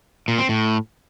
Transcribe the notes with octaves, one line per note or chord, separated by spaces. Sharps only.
A#2
C4
A2